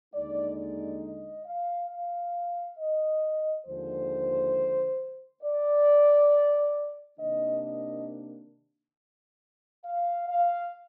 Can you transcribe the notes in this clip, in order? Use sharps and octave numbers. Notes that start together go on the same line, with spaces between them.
D#2 D3 G#3 D#4 D5
D5
D#5
F5
F5
D#5
D#2 D3 F3 G#3 C5
D5
C3 D#3 A#3 D4 D#5
D#5
F5
F5